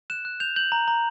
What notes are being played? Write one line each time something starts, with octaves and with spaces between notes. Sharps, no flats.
F#6 E7
F#6
G6 F7
G6 F#7
A#5
A#5